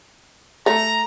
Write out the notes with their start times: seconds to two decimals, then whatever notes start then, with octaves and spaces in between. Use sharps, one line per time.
0.66 A3 A#5